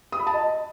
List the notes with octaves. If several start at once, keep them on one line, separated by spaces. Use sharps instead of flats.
D#6
B5
A5
D#5